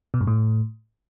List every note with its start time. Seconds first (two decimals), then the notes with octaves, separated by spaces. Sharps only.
0.14 B2
0.21 G2
0.27 A2